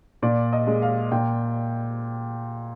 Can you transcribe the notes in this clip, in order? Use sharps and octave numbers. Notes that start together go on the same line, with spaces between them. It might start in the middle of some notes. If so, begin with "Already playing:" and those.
A#2 D5
D#5
G#3
F5
A#2 G5